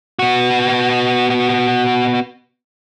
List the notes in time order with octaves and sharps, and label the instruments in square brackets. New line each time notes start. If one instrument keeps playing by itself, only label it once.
[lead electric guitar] B3 F#4